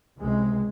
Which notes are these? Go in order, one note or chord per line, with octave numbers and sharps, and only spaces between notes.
C#2 C3 G#3